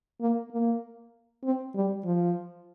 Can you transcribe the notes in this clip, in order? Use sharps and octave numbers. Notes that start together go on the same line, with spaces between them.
A#3
A#3
C4
G3
F3